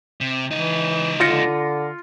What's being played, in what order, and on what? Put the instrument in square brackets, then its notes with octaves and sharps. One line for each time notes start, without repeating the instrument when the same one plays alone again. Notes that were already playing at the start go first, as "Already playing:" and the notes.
[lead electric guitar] C3
[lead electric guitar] C#2 D#4 [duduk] E3
[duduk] D3 [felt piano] F4 A#6 C#7